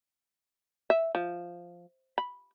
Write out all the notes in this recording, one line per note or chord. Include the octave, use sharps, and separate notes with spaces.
E5
F3
B5